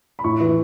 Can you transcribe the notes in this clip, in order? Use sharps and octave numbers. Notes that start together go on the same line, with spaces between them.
B5
A2 C#6
E3